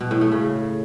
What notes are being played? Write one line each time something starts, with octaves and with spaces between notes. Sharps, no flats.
B2
A2
A3
C#3